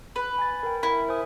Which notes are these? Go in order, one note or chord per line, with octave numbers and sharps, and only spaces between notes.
B4
G#5 A6
A#4 G5
E4 A#4
C5 G#5 D#6